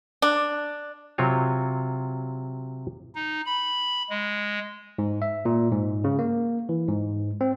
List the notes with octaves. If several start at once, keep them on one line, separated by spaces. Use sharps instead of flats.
D4
C3 F#3 C4 F4 C#5
D#4
B5
G#3
G#2
E5
A#2
G#2
C#3
A#3
E3
G#2
C4